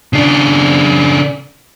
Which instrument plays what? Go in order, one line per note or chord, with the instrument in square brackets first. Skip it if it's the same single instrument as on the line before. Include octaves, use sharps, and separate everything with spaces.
[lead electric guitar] C#3 D4